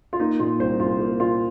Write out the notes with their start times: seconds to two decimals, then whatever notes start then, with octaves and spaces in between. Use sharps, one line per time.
0.13 F4
0.20 A#3 D#4
0.40 A#2 F4
0.59 C2 C5
0.80 C2 F4
1.00 A#3
1.20 A#2 F4